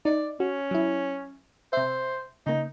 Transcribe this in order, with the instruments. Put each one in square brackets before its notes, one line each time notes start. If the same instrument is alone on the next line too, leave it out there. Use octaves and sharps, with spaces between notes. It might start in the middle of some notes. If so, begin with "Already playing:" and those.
[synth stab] D#4 [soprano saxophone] D5
[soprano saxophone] C#4 [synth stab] F#4
[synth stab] F#3 E4
[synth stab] C3 E5 [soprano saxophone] C5
[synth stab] C#3 A#3 [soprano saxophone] D#4